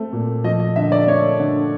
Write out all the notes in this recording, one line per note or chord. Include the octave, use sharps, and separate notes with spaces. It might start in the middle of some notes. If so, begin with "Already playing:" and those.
Already playing: A3 C4
A#2
F3 D#5
D#5
D3 E5
D5
A3 C#5
D3